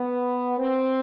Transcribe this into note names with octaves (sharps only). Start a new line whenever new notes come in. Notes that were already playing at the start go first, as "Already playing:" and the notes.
Already playing: B3
C4